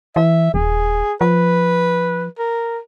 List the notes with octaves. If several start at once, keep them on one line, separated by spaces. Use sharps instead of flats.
E3 E5
D#1 G#4
F3 B4
A#4